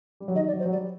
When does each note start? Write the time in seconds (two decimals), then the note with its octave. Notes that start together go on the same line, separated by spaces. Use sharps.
0.20 G3
0.28 F#3
0.35 D#3 D#5
0.47 D5
0.53 F#3
0.59 C5
0.66 F#3
0.72 G3 D5